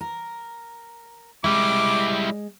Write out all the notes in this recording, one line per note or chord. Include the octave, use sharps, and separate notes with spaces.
A#4
G3 G#3 E4 D6